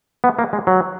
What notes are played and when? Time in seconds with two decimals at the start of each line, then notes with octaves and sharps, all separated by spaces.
0.24 B3
0.39 A#3
0.53 G#3
0.67 F#3